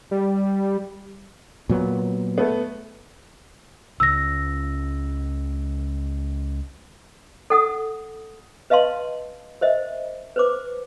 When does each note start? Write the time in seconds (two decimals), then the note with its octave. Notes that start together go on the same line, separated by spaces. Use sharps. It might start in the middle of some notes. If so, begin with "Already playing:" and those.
0.11 G3
1.70 A#2 F#3 B3
2.38 A3 B3
4.00 C#2 C#3 E6 A#6
7.50 A4 F#5 D#6
8.70 B4 D#5 F5 A5 C6
9.61 A#4 C5 D#5 E5
10.36 B4 C5 D6